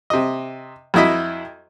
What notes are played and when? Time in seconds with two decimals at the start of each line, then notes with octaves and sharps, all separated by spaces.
0.10 C3 D#5
0.94 F2 F#3 E4 D#5 B5